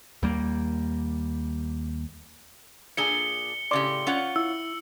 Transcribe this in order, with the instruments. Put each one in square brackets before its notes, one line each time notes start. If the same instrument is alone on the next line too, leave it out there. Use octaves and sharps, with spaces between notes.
[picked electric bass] D#2 G3 A#3
[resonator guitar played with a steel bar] A#2 D4 G#4 [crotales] C#7 G7
[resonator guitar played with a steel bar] A2 C#3 G4 [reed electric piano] D5 C6 D6
[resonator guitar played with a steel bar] C#4 F4 F#5
[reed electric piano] E4 [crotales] E6